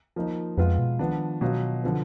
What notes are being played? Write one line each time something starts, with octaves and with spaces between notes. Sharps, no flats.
F3 A#3 D#4
F2 G#3 B3 F4 B4 F5
B2
D#3 F3 B3 D4
B2 F#3 B3 F4
D3 F3 B3